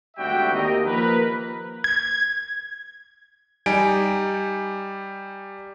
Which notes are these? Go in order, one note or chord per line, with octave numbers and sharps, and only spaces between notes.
G#1 D2 G3 F#4 E5 G5
D#2 G4 A#4 D#5
F3 A#3 A#4 B4
G#6
G3 D#4 G#5 D7